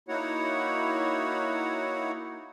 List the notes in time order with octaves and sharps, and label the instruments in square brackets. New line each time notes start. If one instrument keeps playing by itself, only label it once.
[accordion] A#3 D#4 E4 F#4 C#5 F#5